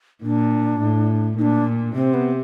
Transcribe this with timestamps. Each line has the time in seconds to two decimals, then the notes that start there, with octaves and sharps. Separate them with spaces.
0.23 A#2 D4
0.81 A2
1.37 A#2 D#4
1.42 D4
1.95 C3 C4
2.14 B3